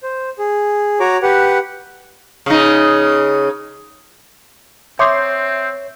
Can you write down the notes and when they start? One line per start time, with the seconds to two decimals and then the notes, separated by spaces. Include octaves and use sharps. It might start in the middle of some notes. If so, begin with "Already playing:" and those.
0.03 C5
0.39 G#4
1.00 F#4 C#5 A#5 D6
1.23 G4 B4 F#5
2.46 C#3 D#4
4.99 C4 C#5 E5 C6 D6 D#6 G6 C7